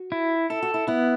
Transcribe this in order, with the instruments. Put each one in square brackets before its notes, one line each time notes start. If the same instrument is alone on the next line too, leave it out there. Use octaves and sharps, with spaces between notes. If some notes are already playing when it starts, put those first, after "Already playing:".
Already playing: [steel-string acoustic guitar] F#4
[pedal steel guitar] E4
[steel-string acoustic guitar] E4 [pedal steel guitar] A4
[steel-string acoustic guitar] F#4
E4
[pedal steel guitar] B3 [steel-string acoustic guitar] E4